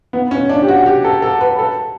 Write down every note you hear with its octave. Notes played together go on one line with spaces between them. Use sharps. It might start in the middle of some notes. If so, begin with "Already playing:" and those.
B3
C#4
D4
G4
F#4
G4
A4
A4
B4
A4